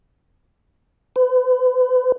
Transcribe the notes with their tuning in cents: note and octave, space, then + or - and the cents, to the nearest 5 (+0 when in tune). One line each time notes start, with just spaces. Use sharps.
B4 +40